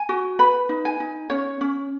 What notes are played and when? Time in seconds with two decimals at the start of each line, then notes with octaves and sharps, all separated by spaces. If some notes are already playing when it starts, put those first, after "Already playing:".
Already playing: G#5
0.09 F#4
0.39 B4 B5
0.69 D#4
0.85 G#5
1.00 D#4
1.30 C#4 C#5
1.61 C#4